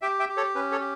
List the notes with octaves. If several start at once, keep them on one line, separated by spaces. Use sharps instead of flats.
G4 E5 G5
E5 G5
G4
A4 C#5
C#4 B4
A4 C#5
G4